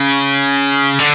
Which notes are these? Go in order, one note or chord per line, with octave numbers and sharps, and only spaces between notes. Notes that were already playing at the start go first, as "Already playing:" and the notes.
Already playing: C#3
D3